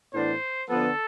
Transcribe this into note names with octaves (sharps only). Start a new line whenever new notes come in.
A2 E3 B3 D4 C5
D3 F3 B3 A4